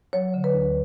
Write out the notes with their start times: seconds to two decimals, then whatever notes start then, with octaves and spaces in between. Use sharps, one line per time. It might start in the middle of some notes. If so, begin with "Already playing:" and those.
0.13 F#3 C#5
0.34 D3
0.44 B4
0.54 D2